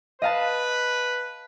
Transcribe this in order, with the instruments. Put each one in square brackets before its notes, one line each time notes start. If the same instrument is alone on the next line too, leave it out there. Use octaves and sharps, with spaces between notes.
[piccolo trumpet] B4 [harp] D#5 F5 A5